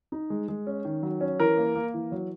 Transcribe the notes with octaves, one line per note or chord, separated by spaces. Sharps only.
D#4
G#3
G#3
C#4
D#3
F#3
C#4
E3 A#4
A#3
A#3
E3
F#3